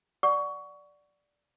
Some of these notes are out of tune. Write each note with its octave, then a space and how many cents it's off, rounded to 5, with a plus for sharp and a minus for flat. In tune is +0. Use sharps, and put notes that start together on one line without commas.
D5 +0 F#5 +0 C#6 +20